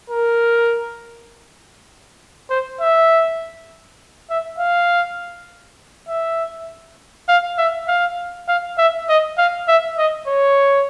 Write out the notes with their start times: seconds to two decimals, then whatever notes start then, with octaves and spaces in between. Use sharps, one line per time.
0.10 A#4
2.50 C5
2.80 E5
4.30 E5
4.59 F5
6.08 E5
7.28 F5
7.58 E5
7.88 F5
8.48 F5
8.78 E5
9.09 D#5
9.38 F5
9.68 E5
9.98 D#5
10.27 C#5